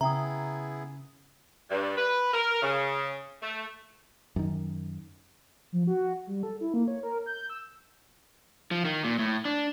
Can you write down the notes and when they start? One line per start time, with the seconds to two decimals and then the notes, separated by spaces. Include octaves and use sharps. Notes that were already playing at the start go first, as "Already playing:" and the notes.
0.01 C#3 B3 E4 G#4 E5 G5 A#5 D#6
1.70 G2
1.97 B4
2.33 A#4
2.62 C#3
3.42 A3
4.36 F#2 D#3
5.72 F3
5.87 F#4
6.27 G3
6.43 A4
6.61 E4
6.74 A#3
6.88 C#5
7.03 A#4
7.26 G6
7.50 E6
8.71 F3
8.85 D#3
9.04 A#2
9.19 A2
9.45 D4